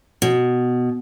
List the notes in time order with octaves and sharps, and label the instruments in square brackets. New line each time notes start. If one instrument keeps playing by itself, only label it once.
[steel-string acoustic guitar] B2